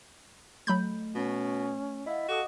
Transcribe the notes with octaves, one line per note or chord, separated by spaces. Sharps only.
F#3 A3 B5 G6
B2 C#4
E4 D#5 F5 F#5
F#4 A4 D#5 D6 D#6